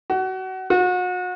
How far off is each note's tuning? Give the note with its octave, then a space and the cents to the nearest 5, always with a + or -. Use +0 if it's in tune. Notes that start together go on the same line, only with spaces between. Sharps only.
F#4 +25
F#4 -35